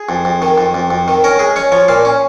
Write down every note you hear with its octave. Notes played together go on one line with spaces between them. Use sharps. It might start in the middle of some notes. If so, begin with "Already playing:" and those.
Already playing: G#4
F2
F2
D#3
F2
F2
F2
D#3
C#4 A#4
G#3 G#4
C#4 C#5
F3 C#5
A#2 F5
C#4